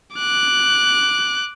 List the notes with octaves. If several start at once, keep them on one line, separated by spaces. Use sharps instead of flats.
D6 F#6